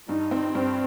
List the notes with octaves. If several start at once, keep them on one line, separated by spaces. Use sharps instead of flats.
G2 D#4
C4
G2 C4